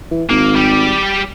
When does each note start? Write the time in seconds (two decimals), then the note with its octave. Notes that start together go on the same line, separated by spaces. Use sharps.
0.11 E3
0.29 G#1 A#3
0.56 G3 G4